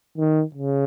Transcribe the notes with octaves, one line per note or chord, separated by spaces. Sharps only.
D#3
C#3